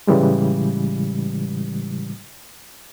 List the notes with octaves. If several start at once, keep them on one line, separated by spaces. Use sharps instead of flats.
A2 C#3 E3 G3 G#3